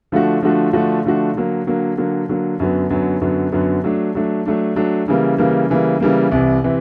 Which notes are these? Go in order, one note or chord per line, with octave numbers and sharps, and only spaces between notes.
D3 F3 A3 D4 F#4
D3 F3 A3 D4 F#4
D3 F3 A3 D4 F#4
D3 F3 A3 D4 F#4
D3 F#3 A#3
D3 F#3 A#3
D3 F#3 A#3
D3 F#3 A#3
F#2 D3 F#3 B3
F#2 D3 F#3 B3
F#2 D3 F#3 B3
F#2 D3 F#3 B3
F#3 A3 D4
F#3 A3 D4
F#3 A3 D4
F#3 A3 D4
C#3 E3 G3 A#3
C#3 E3 G3 A#3
C#3 E3 G3 A#3
C#3 E3 G3 A#3
C2 C3 E3
C3 E3